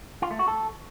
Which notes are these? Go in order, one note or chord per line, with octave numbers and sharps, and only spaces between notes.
F4
A3
F#4
A4